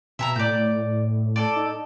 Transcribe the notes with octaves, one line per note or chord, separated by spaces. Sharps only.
B2 E5 A5 A#5
A2 D5 G6
A4 D5
D#4